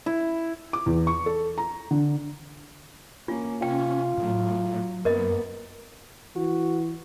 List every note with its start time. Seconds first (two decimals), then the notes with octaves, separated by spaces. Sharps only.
0.06 E4
0.73 D6
0.86 E2
1.07 C#6
1.26 A4
1.58 A#5
1.91 D3
3.28 A#3 C#4 F4
3.62 C3 C#4 F4 G5
4.17 A2 F#3
5.05 F#2 A#3 B3 A#4 D#5
6.36 E3 F#4